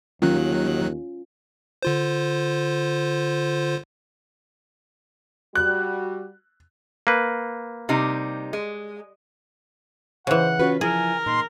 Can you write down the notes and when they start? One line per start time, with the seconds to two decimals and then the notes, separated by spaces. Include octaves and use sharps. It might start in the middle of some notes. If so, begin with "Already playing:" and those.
0.22 D#2 D#3 F#3 C#4 F4 F#6
1.83 D3 F4 C5
5.55 G3 F#4 F#6
7.07 A#3 B4
7.89 C3 G3 D#4
8.53 G#3
10.27 C#3 E3 C5 F#5
10.59 C#4 F4 F#4 B4
10.81 F3 E4 G#4 A#4 G#5
11.26 A#2 D#4 C6